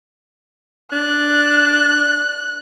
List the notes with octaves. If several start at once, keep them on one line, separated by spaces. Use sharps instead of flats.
D4 F#6